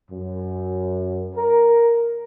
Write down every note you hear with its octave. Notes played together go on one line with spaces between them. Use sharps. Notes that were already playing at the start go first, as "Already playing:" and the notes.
F#2
A#4